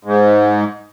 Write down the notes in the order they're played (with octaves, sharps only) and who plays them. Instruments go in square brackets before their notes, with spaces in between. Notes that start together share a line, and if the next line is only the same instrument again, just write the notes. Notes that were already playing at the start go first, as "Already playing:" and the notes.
[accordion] G#2